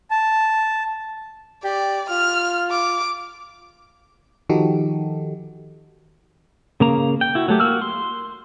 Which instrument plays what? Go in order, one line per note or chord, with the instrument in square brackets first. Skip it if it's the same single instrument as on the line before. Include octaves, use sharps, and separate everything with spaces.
[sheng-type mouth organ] A5
[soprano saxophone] G4 [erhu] D5
[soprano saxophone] F4 [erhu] F6
[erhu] D6
[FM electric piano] D#3 F3 D#4 F#4 G4 A4
[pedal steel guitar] C#3 A#3 A#5
G5
E4 F#4
F#3 A3 G4
A#3 F#4 E6 F6
C6